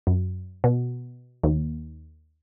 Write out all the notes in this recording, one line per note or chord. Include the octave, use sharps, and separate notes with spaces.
F#2
B2
D#2